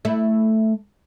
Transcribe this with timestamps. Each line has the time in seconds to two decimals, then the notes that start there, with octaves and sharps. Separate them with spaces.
0.05 A3 E4